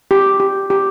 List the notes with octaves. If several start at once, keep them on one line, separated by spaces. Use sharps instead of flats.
G4
G4
G4